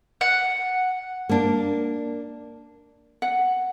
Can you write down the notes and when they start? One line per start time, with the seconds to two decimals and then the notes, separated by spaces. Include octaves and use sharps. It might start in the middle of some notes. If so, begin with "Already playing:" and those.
0.21 F#5
1.29 A#3 D4
3.22 F#5